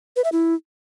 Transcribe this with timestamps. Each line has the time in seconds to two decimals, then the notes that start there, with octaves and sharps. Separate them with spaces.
0.16 B4
0.24 E5
0.32 E4